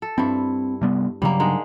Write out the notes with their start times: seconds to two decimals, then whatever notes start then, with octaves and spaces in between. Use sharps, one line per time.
0.02 A4
0.18 G2 C4 E4
0.81 C3 G3 B3
1.22 G2 C#3 F#3 G3 A#3
1.40 D3 G#3 D#4